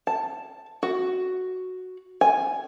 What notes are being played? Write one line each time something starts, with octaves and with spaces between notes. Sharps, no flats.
A5
F#4
G#5